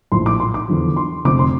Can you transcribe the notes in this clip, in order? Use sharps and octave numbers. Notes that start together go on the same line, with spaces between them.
A#1 A2 F3 C6
D6
C6
D6
E2 D3 F3
C6
F1 F2 D3 D6
C6